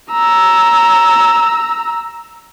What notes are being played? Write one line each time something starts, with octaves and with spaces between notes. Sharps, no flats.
A#5 E6